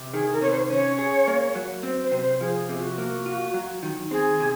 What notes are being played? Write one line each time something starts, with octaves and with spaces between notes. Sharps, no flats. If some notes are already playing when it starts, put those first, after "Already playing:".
Already playing: C3
D#3 G#4
A#4
C3 C#5
C5
C#4 C#5
G#4
A#3
F#3
C4 C5
C5
C3
C5
F3 G#4
C3 G#4
F#4
A#3
F4
F#3
D#3
C4 G#4
C3